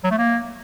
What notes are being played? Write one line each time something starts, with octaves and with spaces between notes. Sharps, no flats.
F#3
A3
A#3